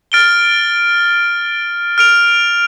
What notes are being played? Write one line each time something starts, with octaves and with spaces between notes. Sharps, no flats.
F6 A6 D7 G7
F6 D7 F7